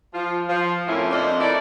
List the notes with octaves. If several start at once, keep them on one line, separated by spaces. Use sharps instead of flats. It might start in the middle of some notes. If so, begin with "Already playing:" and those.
F3 F4
F3
F2 A2 A#3 C#4 E4 F4
F2 F3 C4 D4 D5 D#5
A3 E4 A#4 D5